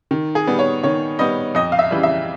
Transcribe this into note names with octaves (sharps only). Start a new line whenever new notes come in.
D#3
G#4
G3 B3
C#5
D#3 C#5
G3 B3 D#5
F2 D#5
F5
E5
C#3 E3 G3
E5